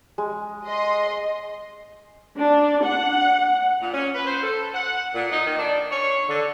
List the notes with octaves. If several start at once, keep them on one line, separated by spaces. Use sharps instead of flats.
G#3
D#5 C6
D4
F#5
A#2
C#4
B4
C5
A4
F#5
A#2
D#4
D#3
D4
C#5
D3